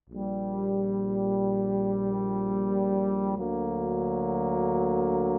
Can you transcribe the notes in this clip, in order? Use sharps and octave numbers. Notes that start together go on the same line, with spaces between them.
A#1 A#2 G3
D2 D3 F#3 A#3